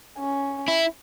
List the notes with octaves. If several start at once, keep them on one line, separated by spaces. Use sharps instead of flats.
C#4
E4